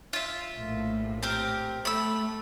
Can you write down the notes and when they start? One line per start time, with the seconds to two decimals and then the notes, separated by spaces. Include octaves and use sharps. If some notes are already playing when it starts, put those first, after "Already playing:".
0.13 F4 E5
0.55 A#1 A2
1.23 C4 G4 A#4
1.85 A3 B5 E6